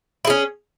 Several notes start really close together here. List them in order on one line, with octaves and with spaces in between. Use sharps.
E4 G#4 C#4